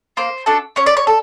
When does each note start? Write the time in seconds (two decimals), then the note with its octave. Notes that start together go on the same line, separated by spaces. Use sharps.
0.17 A#3 C5
0.46 D4 F#4 A4
0.76 C#4 C#5
0.86 D5
0.97 C#5
1.07 A4